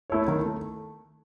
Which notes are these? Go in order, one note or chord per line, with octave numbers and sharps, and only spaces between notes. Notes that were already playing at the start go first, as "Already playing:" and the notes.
A3 E4 A4 C#5
D#3
A3